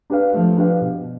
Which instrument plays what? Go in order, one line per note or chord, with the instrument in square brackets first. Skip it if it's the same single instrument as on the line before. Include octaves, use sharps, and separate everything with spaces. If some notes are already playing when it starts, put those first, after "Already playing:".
[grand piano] D4 G4 B4 F5
[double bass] F3 [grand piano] A3
[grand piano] D4 G4 B4 F5
B2